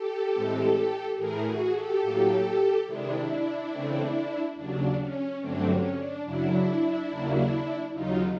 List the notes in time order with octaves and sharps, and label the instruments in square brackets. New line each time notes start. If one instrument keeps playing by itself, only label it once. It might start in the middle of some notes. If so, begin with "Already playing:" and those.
Already playing: [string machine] G4 A4
A2 E3 G#3 C4
A2 E3 A3 G#4 A#4
F#4 G#4
G4 A4
A2 F#3 A#3
C3 D#3 G#3 D4 E4
C#3 E3 A3 C4
D#2 C#3 F#3 D4
C#4
G2 D3 F#3 A3 C4 D4
C#4
D4
F#2 C#3 F#3 D4 E4
D#2 C#3 F#3 A#3
D#2 C#3 F#3 D#4 F4